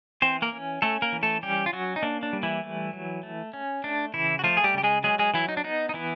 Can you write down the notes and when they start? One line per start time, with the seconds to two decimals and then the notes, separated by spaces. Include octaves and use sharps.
0.22 E3 C4 C5
0.42 A#3 A#4
0.52 C#4
0.82 A3 C#4 A4
1.02 A#3 A#4
1.12 E3
1.23 A3 A4
1.43 G3 C#4 G4
1.66 F4
1.73 F#3 C#4 F#4
1.96 D#4
2.03 A#3 D4
2.23 D4
2.33 G3
2.43 E3 E4
2.63 A3
2.93 F#3
3.23 A3
3.54 C#4
3.84 A3 D4
4.14 C#3 E3 E4
4.39 F#4
4.44 F3 A3 F4
4.57 G#4
4.64 G3 G4
4.74 C#3 G4
4.84 G#3 G#4
5.03 F#3 G#3 G#4
5.19 G#3 G#4
5.34 E3 F#3 E4
5.49 D#4
5.57 D4
5.64 B3 D#4
5.89 D#4
5.94 E3 B3 E4